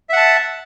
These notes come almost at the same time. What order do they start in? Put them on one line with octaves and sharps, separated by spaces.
E5 F#5 A5